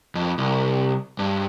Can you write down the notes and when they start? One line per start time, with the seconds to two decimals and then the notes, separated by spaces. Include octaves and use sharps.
0.15 F2
0.38 C2
1.19 G2